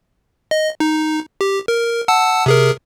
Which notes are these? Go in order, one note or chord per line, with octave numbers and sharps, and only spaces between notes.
D#5
D#4
G4
A#4
F#5 A5 E6
C3 G#4 A#4